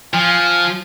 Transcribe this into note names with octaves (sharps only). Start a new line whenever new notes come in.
F3 G#5